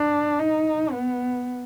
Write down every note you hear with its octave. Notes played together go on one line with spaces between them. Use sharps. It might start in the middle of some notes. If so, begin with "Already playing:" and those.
Already playing: D4
D#4
B3